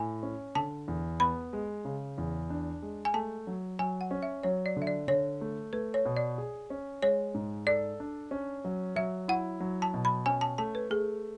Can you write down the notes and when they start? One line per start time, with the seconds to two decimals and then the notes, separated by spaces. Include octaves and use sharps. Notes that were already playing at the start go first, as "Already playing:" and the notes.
Already playing: A2 G#5
0.23 C#4
0.55 D3 A5
0.88 E2
1.20 B3 B5
1.53 G#3
1.85 C#3
2.18 E2
2.50 D4
2.82 G#3
3.05 G#5
3.14 A3 A5
3.47 F#3
3.79 F#3 G#5
4.01 F#5
4.11 C#4
4.23 E5
4.43 F#3 C#5
4.66 D5
4.77 D3
4.82 E5
4.87 D5
5.08 D3 C#5
5.41 A3
5.73 A3 B4
5.94 C#5
6.05 B2
6.17 D5
6.38 G#4
6.70 C#4
7.02 G#3 C#5
7.34 G#2
7.67 A4 D5
8.00 D4
8.31 C#4
8.65 F#3
8.96 F#3 E5
9.28 E4 F#5
9.60 F#3
9.82 A5
9.94 B2
10.05 B5
10.26 C#4 G#5
10.41 A5
10.58 A3 A5
10.75 B4
10.90 A3 G#4